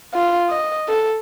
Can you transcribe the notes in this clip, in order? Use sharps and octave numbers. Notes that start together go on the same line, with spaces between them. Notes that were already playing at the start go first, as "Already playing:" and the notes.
F4
D#5
A4